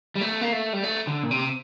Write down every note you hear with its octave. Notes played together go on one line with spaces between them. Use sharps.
G3
A3
A#3
A3
G3
A3
D3
A#2
C3